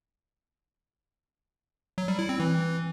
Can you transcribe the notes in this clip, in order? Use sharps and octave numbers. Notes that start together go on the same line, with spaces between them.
F#3
G3
E4
C4
E3